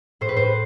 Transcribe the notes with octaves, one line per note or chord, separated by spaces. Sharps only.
A2 C5
B4
C5